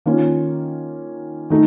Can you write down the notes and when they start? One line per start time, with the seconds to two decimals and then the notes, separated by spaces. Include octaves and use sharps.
0.06 D#3 A#3 C#4 F4
1.50 D#3 A3 D#4